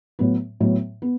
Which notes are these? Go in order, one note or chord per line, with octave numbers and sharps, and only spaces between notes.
A2 F#3 B3
A2 F#3 B3
B3